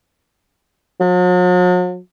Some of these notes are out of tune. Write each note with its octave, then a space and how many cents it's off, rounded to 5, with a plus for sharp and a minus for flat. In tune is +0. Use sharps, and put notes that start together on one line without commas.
F#3 -45